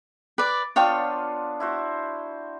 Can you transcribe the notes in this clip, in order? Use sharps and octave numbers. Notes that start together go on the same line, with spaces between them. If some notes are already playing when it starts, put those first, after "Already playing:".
B4 D5 D6
B3 D4 F4 C#5 F5 G5
E4 F#4 C5